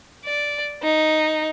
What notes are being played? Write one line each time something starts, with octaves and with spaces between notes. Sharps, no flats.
D5
D#4